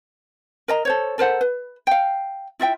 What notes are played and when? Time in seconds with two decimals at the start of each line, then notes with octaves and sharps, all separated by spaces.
0.68 A#4 D#5 A#5
0.85 A4 C5 C#5
1.18 A4 A#4 C5 F#5
1.41 B4
1.87 F5 G5
2.59 E4 F4 E5 G5